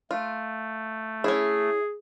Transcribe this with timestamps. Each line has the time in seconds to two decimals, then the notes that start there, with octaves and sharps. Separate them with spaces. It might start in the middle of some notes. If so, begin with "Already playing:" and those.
0.11 A3 F4
1.24 C#4 E4 G#4